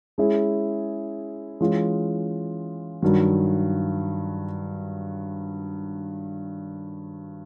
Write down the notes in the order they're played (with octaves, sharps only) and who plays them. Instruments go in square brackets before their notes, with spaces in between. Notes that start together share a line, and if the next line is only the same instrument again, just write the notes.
[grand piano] G#3 C#4 E4 G#4
E3 G#3 C#4 F4
G2 D#3 F#3